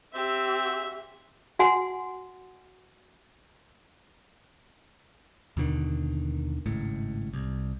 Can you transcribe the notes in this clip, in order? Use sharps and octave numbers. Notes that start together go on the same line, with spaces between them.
C4 G4 E5
F#4 F#5 G#5 C6
D#2 B2 D3 D#3
G#1 C#2 A2
C2